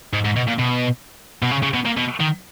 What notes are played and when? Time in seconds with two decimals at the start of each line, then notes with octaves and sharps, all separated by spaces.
0.13 G#2
0.25 G#2
0.36 B2
0.48 A#2
0.59 B2
1.42 B2
1.51 C#3
1.63 C#3
1.74 B2
1.85 A#2
1.97 B2
2.20 D#3